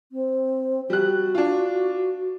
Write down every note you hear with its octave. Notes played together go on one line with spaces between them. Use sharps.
C4
G3 F#4 F#6
D4 F4